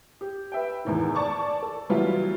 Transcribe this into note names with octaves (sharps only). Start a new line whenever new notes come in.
G4
B4 E5 G5
E2 A2 D#3
D5 A5 C#6 D6
A4
E3 F#3 G3 B3 E4 F4